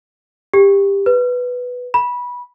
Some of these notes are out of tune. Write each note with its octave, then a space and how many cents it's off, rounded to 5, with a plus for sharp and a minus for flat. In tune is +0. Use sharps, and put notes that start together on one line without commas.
G4 +20
B4 +0
B5 -15